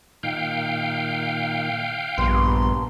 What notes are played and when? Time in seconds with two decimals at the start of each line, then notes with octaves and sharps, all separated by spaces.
0.23 A#2 D#3 F5 G5
2.18 A#1 G2 B3 C6